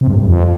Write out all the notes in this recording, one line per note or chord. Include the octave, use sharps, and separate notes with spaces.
C3
G2
A2
G2
F2